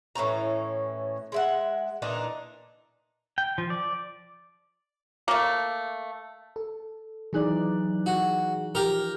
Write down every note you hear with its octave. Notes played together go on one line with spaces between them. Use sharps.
A2 E3 C#4 A#5
G#3 E5 F#5
A#2 E3 D4 D#4
G5
F3
D5
A3 A#3
A4
E3 F#3 D#4 G#4 D5 F#6
F#4
F3 G4 A#4